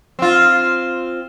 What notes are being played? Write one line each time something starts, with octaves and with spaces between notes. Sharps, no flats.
C4 F4